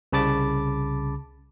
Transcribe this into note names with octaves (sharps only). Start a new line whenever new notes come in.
C2 C#3 A5 B5 D6 A6